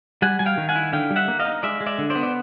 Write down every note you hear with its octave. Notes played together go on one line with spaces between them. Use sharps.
G3 F#5 G#5
G3 G#5
F5 G5
D#3
F#5 G#5
E4
D3 F5 G5
G3
E5 F#5
A#3
D#5 F5
D#4
G#3 D5 E5
G#3
D5 E5
D3
C5 D5
B3
D5